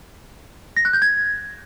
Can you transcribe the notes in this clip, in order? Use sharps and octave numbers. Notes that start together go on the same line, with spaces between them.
A#6
F#6
G6
G#6